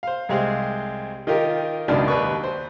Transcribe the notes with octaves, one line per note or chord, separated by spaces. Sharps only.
C5 F5
C2 G3 G#3 C4 F5
D#3 D#4 F4 G4 A#4
C#2 F#2 B2 D#3 D4 D5
D#2 B4 C#6
C5